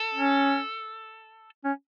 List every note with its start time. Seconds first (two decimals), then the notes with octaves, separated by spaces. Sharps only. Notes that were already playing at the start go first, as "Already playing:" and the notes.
Already playing: A4
0.14 C#4
1.64 C#4